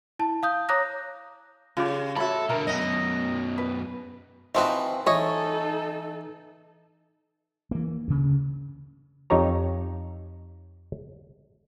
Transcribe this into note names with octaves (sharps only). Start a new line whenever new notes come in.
E4 A5
F5 D#6 G6
C#5 A#5 D6 D#6 F#6 A#6
C#3 F4 G4
A2 F#4 A4 C#5 E5 B5
B2 D3 A#4 A#5
F#2 B2 D#5
B4
E3 F3 C4 D#4 F#4
E3 D#4 A4 C#5 D#5
E3 A#3
D2 C#3
F2 D#4 G4 C#5 A#5